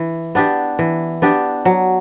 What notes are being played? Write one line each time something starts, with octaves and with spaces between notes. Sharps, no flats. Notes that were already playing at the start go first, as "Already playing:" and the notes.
Already playing: E3
B3 D4 G4
E3
B3 D4 G4
F#3